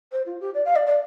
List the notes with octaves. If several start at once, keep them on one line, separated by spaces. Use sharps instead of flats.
C5
F4
G4
D5
F5
D5
D5